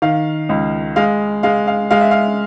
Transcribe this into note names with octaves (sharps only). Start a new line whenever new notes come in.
D#3 F5
C#2
G#3 F5
G#3 F5
F5
G#3 F5
E5
F5